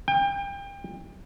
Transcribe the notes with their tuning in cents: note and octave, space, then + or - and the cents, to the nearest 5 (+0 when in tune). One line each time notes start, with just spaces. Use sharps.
G5 +30